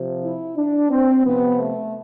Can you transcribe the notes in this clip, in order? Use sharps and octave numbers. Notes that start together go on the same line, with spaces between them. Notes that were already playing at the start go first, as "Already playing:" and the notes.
Already playing: C3 F3
E4
D4
C4
C3 F3 B3
A3